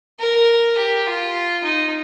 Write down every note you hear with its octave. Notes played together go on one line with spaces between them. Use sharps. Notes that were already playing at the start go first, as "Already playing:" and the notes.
A#4
G4
F4
D#4